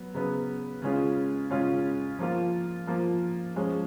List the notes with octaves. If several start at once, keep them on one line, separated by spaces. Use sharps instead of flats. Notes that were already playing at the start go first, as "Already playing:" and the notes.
Already playing: F#3 B3
C#3 F#3 B3
C#3 G#3 C#4 F4
C#3 G#3 C#4 F4
F3 A#3 F4
F3 A#3 F4
F3 G#3 C#4